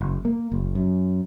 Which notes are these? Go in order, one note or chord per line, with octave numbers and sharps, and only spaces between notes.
F#1
A#3
F#1
F#2